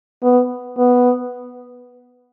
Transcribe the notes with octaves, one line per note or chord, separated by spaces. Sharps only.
B3
B3